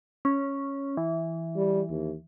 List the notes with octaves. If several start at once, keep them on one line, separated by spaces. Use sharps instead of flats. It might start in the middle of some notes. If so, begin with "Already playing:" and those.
C#4
E3
G3
D#2